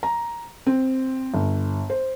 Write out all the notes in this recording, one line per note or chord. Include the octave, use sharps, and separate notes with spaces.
A#5
C4
G1
C5